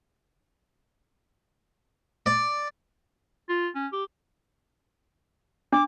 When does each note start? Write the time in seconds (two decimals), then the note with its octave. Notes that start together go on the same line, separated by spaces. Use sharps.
2.26 D5
3.49 F4
3.75 C#4
3.92 G4
5.73 D4 D6